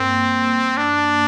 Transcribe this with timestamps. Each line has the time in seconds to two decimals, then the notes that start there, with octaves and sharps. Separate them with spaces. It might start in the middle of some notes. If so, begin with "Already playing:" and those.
Already playing: G2 A#3 C4
0.77 D4